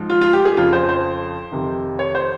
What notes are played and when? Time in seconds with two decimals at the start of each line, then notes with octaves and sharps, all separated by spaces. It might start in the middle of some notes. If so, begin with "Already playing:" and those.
Already playing: G#2 F3
0.10 F4
0.21 F4
0.33 G4
0.45 G#4
0.57 F2 C#3 F3 F4
0.73 C5
0.89 C5
1.52 F2 C3 D#3
1.99 C#5
2.15 C5